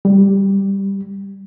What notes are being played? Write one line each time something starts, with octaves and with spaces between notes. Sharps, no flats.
G3